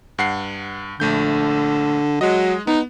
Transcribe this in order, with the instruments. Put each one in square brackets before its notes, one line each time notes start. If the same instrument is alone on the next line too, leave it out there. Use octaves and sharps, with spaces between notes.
[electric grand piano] G2 F#5 C7
[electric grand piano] A#1 A3 G6 [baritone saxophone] D3
[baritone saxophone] F#3 [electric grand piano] G#3 D#5
[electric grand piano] B3 [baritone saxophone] D#4